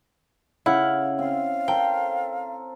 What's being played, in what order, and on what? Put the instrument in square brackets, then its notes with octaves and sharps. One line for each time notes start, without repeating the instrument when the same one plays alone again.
[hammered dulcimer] C#3 F5 [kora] E4 [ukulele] F#5
[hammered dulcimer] C4 [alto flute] F5
[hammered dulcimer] A4 A#4 C5 [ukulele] G5